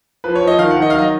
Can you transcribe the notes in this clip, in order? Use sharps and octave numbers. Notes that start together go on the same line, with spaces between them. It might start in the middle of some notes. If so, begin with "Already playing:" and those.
F3 B4
C#5
F3
D#5
D#3 F5
F#5
D#3
D#5
F5
F#3 D#5